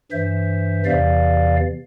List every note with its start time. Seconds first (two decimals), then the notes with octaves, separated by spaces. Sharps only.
0.12 G2 E3 C5 E5
0.85 E2 C3 E3 D5 F5